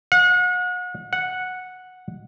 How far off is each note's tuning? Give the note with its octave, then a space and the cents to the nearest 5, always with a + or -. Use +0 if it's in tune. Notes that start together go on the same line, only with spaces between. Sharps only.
F#5 -40
F#5 -10